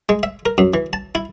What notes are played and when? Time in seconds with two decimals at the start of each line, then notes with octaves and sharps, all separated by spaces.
0.09 G#3
0.23 E5
0.46 A#4
0.58 F#2
0.74 E3
0.93 A5
1.15 E4